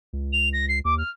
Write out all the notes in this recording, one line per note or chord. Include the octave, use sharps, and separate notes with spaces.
C#2
F7
A#6
C7
D#2 D6
F6